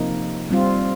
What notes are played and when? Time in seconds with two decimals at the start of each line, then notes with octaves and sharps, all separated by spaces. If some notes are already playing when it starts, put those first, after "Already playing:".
Already playing: C3 F3 A#3 D#4
0.50 G3 C4 F4